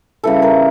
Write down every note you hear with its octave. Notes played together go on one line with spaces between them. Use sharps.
C#3 E3 G3 A4
A#4